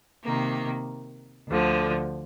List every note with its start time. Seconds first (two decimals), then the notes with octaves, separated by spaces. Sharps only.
0.24 C3 D#3 A#3
1.48 D2 D3 F3